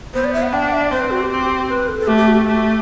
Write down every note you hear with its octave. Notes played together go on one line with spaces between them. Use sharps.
B3 C5
D5
E5
F#5
D4 G5
F#5
E5
D5
C4 C5
B4
F#4
G4
C4
B4
A4
A4
A3 G4
G4
F#4
G4
A3